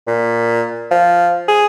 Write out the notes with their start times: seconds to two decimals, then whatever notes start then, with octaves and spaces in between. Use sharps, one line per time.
0.07 A#2
0.91 F3
1.48 G#4